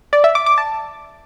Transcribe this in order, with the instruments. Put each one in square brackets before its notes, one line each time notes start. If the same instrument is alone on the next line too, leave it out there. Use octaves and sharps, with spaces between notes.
[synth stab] D5
E5
D6
D6
A5